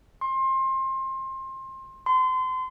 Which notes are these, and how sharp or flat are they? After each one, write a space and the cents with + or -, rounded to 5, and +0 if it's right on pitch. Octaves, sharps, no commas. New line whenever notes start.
C6 +25
C6 -30